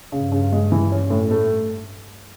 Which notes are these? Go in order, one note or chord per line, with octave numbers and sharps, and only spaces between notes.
G2 C#3
C#3
G#3
E3
C#4
A2
A3